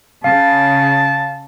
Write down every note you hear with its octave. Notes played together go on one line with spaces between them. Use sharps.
C#3 F5 A5